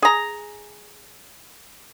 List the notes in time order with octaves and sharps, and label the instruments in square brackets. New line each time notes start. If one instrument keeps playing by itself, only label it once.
[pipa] G#4 A#5